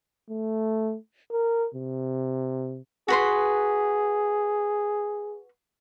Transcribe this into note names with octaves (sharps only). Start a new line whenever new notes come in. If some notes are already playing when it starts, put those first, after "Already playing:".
A3
A#4
C3
F#4 G#4 B4 C6